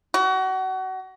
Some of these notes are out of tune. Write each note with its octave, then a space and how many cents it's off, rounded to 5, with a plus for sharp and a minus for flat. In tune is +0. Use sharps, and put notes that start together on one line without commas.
F#4 +30